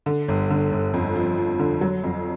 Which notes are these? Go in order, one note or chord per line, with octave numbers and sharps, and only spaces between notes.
D3
G1
D3
G1
F2
F3
F3
D3
F#3
F2